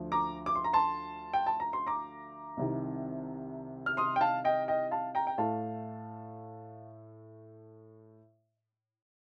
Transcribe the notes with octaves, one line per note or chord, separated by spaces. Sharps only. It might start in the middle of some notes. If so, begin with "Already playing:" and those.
Already playing: D2 D3 F3
A#5 D6
D6
C6
A#5
A5 C6
G5
A5
A#5
C6
A#5 D6
C2 C3 D#3
F6
C6 D#6
G5
F5 A5
D#5 G5
D#5 G5
F5 A5
G5 A#5
G5
A2 A3 F5 A5